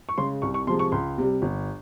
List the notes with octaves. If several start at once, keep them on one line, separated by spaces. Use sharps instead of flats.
C#6
C#3 G#3 C6
C2 C#6
C#6
C3 F3 G#3 C6
C#6
C#2 C6
C3 G3
G1